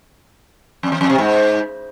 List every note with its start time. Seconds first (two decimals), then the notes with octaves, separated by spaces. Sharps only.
0.83 F2
0.92 E2
1.01 F2
1.10 C3
1.18 G#2